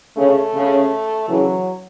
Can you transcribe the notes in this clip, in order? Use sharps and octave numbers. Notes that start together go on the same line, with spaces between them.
C#3 A3
C#3
C#3 E3 F#3